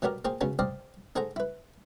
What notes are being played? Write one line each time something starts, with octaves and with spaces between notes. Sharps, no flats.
B2 F#3 G3 B3 G4 A#4
A#3 F4 G#4 C5 G5
C#3 F#3 G#3 B3 C#4
C5 D5 D#5 F5 G5 A5
D#4 G#4 A4 C5 F#5 A#5
E4 B4